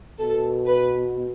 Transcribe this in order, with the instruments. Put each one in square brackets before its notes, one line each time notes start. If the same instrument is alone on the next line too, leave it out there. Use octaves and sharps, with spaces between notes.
[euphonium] B2 [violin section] A4
[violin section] B4